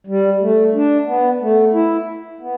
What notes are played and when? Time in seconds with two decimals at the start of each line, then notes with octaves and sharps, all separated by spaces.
0.07 G3
0.41 A3
0.74 D4
1.07 B3
1.41 A3
1.74 E4
2.41 B3